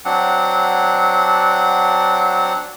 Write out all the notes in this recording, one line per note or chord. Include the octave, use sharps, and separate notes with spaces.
F#3 C4 D4 F#5